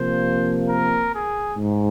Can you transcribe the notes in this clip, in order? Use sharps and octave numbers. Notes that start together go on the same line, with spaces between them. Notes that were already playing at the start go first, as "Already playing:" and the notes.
Already playing: C3 F3 A#3 C5
A#4
G#4
G#2